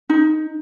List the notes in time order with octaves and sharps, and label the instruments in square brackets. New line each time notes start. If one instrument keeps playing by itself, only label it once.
[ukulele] D#4